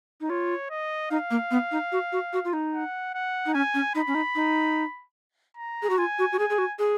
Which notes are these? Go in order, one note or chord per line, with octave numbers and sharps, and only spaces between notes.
D#4
F4 C#5
D#5
D#4 F5
A#3
B3
D#4
F#4
F#4
F#4
F4
D#4
F#5
F#5
D#4
C#4 G#5
C#4
D#4 B5
C#4
D#4
D#4
A#5
G#4
F#4
F4 G#5
F#4
F#4
G#4 G#5
G#4
F#4
G#4